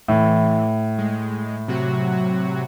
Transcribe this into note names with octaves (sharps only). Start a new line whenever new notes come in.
A2 E3
G#3
C3 F#3 F#4